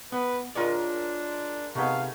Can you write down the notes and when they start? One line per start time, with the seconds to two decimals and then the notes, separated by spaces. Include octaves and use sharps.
0.12 B3 B4
0.55 G#3 D4 F4 A#4 C#5 D5
1.75 C3 A3 B3 D#4 G#4 F5